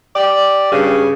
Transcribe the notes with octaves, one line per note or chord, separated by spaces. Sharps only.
G4 D5
G2 C#3